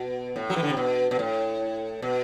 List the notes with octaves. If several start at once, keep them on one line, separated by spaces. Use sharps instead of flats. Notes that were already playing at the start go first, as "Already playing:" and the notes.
Already playing: B2
A2
F#3
E3
D3
C3
B2
B2
A2
B2